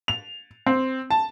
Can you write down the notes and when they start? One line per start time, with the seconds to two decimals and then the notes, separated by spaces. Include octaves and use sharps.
0.08 F7
0.67 C4
1.11 A5